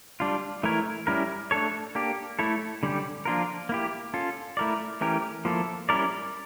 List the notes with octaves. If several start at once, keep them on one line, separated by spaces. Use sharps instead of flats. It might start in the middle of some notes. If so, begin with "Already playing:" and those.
G3 D4 F4
E3 A3 E4 A#4 C#5
G3 C#4 E4 A#4
A3 D4 A4 C#5
A#3 D4 G4
A3 E4 A4 C#5
D3 G3 C#4 G4
F3 A#3 D4 F4 A#4
A#3 E4 G4
C#4 F4 A4
A3 E4 A#4 D5
E3 A3 C#4 G4 A#4
F3 A#3 E4 A4
G3 C#4 E4 A#4 D5